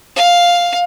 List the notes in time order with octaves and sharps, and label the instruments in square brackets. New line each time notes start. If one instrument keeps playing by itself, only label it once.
[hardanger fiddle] F5